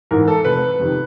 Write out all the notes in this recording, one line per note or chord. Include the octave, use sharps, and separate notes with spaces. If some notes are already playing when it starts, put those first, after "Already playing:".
G#2 E3 A#4
A4
F1 B4
F2 C3 D#3